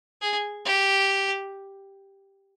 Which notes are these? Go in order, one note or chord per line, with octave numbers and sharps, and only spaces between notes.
G#4
G4